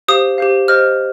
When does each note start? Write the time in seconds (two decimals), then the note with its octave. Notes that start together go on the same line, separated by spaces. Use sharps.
0.08 G4 C5 F5 D#6
0.38 G4 C5 F5
0.68 G4 C5 D#5 F6